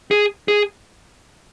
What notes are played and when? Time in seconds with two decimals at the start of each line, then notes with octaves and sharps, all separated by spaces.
0.11 G#4
0.48 G#4